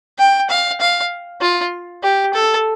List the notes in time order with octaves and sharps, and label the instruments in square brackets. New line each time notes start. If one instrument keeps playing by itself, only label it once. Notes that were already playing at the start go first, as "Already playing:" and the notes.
[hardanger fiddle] G5
F5
F5
F4
G4
A4